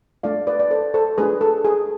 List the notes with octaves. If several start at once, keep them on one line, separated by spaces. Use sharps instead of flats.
A3 D4 F4 D5 F5
B4 D5
D5
A4 C5
A4 C5
A3 D4 F4 G#4 B4
A4
G#4